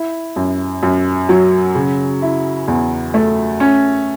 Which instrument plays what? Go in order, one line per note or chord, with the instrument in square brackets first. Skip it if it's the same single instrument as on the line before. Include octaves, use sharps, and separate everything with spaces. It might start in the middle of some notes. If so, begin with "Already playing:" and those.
Already playing: [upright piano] E4
F#2
F#2
F#3
C#3
E4
E2
A3
C#4